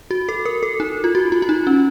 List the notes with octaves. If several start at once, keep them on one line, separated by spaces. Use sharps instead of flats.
F#4
A4
A#4
A4
D#4
F4
F#4
F4
F4
D#4
C#4